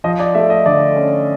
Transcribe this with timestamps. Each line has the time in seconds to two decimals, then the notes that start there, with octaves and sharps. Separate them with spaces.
0.04 F3 D#5
0.19 D5
0.34 A3 E5
0.50 D#5
0.66 D3 D5
0.96 C#4